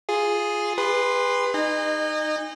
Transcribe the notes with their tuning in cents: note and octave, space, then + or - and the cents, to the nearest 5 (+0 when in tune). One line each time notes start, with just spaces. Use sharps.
F4 +0 G#4 +0
G#4 -45 B4 +0 C6 +0
D#4 -10 D#5 -30 G#5 -35